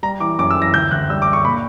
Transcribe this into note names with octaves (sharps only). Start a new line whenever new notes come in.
G3 A#5
E3 D6
F#2 D6
E6
E3
A#6
D2 G6
D2 F#6
G3 E6
D6
G3
C#6
A#2 B5